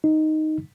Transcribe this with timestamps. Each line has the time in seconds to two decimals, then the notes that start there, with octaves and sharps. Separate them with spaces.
0.04 D#4